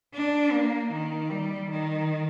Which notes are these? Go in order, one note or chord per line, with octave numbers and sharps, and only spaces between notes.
D4
A#3
D#3
G3
D#3